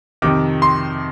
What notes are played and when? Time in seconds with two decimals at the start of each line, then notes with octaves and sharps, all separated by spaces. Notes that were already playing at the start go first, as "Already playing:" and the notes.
0.22 F2 C3 D#3 D6
0.62 C6